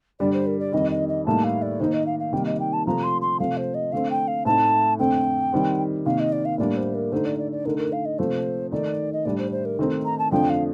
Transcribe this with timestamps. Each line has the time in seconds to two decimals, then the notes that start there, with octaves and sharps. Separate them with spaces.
0.20 G2 D3 G3 D5
0.33 C5
0.47 A#4
0.60 D5
0.72 F2 D#3 G3 D#5
0.91 D#5
1.08 D#5
1.26 A2 G3 A#3 D#4 A5
1.44 F5
1.62 D5
1.80 D#3 A#3 D#4 C5
1.93 D#5
2.06 F5
2.19 F5
2.32 C3 D#3 G3 A#3 D#4 G5
2.46 D#5
2.60 G5
2.73 A5
2.86 C3 F3 A3 A#5
3.03 C6
3.21 C6
3.40 C3 F3 A3 F5
3.57 C5
3.74 D#5
3.92 D3 A3 C4 F5
4.10 G5
4.28 F5
4.45 A2 A3 C4 D#4 A5
4.99 F2 D3 A3 C4 G5
5.52 D#3 G3 C4
6.06 C3 D#3 A#3 F5
6.19 D#5
6.32 D5
6.45 F5
6.58 A2 G3 A#3 D4 D5
6.77 C5
6.95 A#4
7.12 D3 A3 D#4 C5
7.26 D5
7.38 D5
7.52 D5
7.65 D3 A3 D#4 A#4
7.78 A#4
7.92 F5
8.05 D#5
8.19 C3 F3 A3 C5
8.71 D#3 A3 D#4 D5
9.13 D#5
9.25 A2 G3 D4 D5
9.38 C5
9.52 C5
9.65 A#4
9.79 D#3 A3 C4 D#4
10.05 A#5
10.19 A5
10.31 F2 D3 F3 A3 D4 G5
10.50 F5